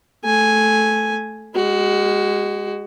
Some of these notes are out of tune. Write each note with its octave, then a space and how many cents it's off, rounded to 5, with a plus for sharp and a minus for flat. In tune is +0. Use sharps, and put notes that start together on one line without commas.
A3 -10 G#5 +0
G#3 -20 F#4 +20